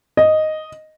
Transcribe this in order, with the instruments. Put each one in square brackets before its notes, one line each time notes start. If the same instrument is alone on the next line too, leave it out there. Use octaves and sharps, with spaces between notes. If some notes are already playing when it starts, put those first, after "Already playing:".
[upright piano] D#5